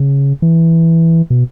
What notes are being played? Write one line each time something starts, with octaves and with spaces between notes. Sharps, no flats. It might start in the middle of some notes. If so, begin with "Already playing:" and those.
Already playing: C#3
E3
B2